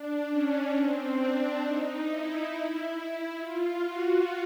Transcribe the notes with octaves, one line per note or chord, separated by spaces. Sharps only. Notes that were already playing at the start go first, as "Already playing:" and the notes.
Already playing: D4
C#4
C4
D4
D#4
E4
E4
F4
F#4